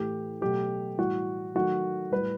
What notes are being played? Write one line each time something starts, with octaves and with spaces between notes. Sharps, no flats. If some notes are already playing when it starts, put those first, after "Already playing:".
Already playing: A2 E3 A3 G4
B2 F#3 A3 G4
A2 E3 G3 F#4
D#3 F#3 A3 F#4
A2 G3 B4